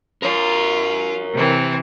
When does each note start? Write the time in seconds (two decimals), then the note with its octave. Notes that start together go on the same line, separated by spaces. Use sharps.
0.22 F4 A#4 C#5
1.35 C3 E3 C4